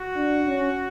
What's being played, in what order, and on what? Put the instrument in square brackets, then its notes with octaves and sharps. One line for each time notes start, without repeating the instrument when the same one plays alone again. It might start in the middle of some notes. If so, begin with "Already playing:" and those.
Already playing: [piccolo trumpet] F#4
[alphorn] D4
C#4